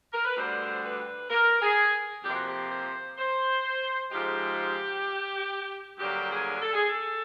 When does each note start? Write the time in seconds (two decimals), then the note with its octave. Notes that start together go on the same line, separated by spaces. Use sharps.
0.13 A#4
0.25 B4
0.37 D2 D3 G3 C5
0.83 B4
1.30 A#4
1.62 G#4
2.24 F2 C3 F3 A#3 G4
2.35 F#4
2.46 G4
2.70 C5
3.18 C5
4.10 G#2 F3 G#3 G4
5.98 G2 D3 F#3 A#3 G4
6.29 G#4
6.61 A4
6.74 G#4
6.88 A4